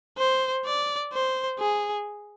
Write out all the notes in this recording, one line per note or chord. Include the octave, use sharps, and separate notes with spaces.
C5
D5
C5
G#4